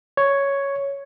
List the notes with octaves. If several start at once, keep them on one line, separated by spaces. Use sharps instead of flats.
C#5